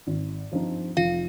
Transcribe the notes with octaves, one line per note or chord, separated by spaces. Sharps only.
G#1
G2 F3 C4 D#4
F1 F4 F5